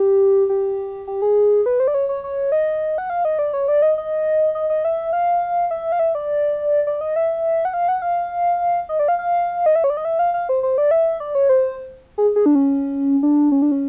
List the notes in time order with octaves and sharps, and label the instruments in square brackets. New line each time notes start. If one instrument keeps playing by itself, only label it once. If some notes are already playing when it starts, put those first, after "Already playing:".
Already playing: [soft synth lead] G4
G4
G4
G#4
B4
C5
D5
C#5
C#5
C#5
D#5
F#5
F5
D#5
D5
C#5
D5
D#5
D#5
D#5
D#5
E5
F5
E5
F5
E5
D5
D5
D#5
E5
F#5
F5
F#5
F5
D#5
D5
F5
F5
D#5
E5
C#5
D5
D#5
E5
F5
F5
C5
C5
D5
E5
D5
C#5
C5
G#4
G#4
D4
C#4
D4
C#4
D4
C#4